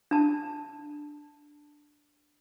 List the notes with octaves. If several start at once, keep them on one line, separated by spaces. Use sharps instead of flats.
D4 A5